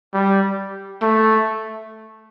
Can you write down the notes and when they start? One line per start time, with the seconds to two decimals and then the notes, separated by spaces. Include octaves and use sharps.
0.14 G3
1.02 A3